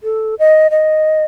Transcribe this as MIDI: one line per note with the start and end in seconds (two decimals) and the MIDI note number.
0.03 0.35 69
0.39 0.71 75
0.71 1.25 75